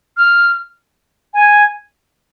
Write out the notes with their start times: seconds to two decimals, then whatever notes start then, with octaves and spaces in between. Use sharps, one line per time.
0.17 F6
1.34 G#5